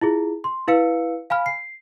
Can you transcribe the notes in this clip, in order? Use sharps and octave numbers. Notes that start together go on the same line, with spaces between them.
E4 F4 G#4
C6
E4 B4 F5 E6 C#7
F5 G#5 B5 F6
C7